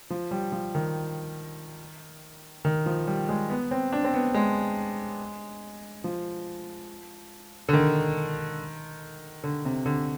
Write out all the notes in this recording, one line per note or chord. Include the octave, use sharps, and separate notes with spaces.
F3
G3
F3
D#3
D#3
F3
G3
G#3
B3
C4
D4
C4
B3
G#3
F3
D3
D#3
D3
C3
D3